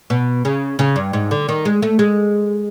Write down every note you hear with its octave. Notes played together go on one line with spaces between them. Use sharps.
B2
C#3
C#3
G2
G#2
D3
D#3
G#3
A3
G#3